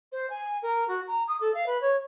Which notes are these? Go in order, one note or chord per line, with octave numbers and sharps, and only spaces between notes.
C5
G#5
A#4
F#4
A#5
D#6
A4
F5
B4
C#5